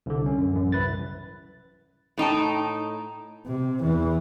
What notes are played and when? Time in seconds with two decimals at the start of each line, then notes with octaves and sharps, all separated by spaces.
0.06 C2 D3
0.26 C#4
0.38 F#2
0.53 A1 F#2
0.72 C2 E4 B4 A6
2.18 A2 D#4 G5 A5
3.47 C3
3.81 E2 E3